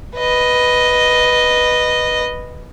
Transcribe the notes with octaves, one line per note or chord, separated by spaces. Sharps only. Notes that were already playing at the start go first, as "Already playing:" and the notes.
B4 D#5